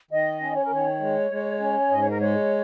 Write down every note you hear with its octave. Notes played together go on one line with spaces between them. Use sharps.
D#3 D#5
C#4
C#5
A#4
D#3 C#5
G#3
G#3
C#4
G#2 D#5
C#5
A#4
G#3 C#5